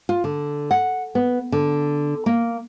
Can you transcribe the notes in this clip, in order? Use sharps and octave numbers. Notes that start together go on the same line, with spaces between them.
F4
D3
F#5
B3
D3
A#3